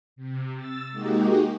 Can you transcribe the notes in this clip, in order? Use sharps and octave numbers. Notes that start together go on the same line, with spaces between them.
C3
E6 A6
G#3 A#3 D#4 F#4 G4